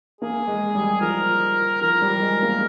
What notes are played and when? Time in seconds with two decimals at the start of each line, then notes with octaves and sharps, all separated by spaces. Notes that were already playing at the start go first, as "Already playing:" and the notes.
0.21 A#3 G#4
0.47 G#3
0.75 G3
1.01 F3 A#4
1.81 F3 A#4
2.02 G3
2.21 G#3
2.42 A#3